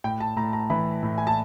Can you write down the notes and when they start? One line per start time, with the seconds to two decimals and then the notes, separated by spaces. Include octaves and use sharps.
0.04 A2 G5
0.20 A5
0.36 A2 A#5
0.53 A#5
0.70 E3 B5
1.03 A2
1.18 G#5
1.27 A5